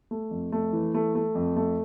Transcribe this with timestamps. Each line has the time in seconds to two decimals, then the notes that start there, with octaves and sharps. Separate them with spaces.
0.11 A3
0.31 F2
0.52 A3
0.73 E3
0.94 A3
1.15 A3
1.35 F2
1.56 A3